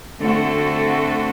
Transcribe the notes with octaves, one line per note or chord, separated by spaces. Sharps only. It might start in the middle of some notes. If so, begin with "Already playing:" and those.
D3 A3 C4 F#4 A4